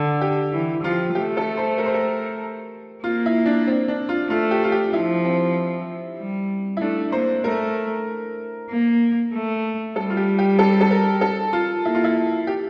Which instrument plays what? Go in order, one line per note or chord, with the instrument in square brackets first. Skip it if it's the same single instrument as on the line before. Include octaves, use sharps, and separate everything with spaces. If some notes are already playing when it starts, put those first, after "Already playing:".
Already playing: [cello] D3
[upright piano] G4
[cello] E3
[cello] F3 [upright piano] F4
[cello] A3 [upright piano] G4
[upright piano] A4
C5
A#4
C5
A#4
[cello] A#3 [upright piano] F4
[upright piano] E4
D4
C4
D4
F4
[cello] A3 [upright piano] F4
[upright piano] G4
F4
G4
[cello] F3 [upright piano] E4
[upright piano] C4
[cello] G3
[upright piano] E4
[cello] A3 [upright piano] D4
[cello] A#3 [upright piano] C5
[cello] A3 [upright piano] A#4
[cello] A#3
A3
[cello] G3 [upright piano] A4
[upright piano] F4
G4
G4
A4
A4
A#4
A4
F4
[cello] A#3 [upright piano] E4
[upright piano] F4
E4
G4